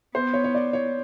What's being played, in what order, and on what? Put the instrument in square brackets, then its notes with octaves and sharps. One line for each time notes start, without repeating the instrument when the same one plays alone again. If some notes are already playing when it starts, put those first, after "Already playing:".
[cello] B3 [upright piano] C5
[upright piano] C#5
C#5
D5
C#5